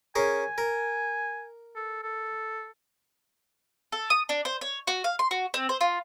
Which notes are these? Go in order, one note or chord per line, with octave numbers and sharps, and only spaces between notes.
C#4 G#4 A#4 G#5
A#4
A4
A4
A4
D#6
D4
C5
C#5
F#4
F5
C6
F#4
C4
C5
F4